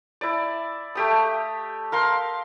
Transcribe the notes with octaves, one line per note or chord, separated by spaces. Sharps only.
E4 D5
A3 G4 D#6
A#4 F5 C6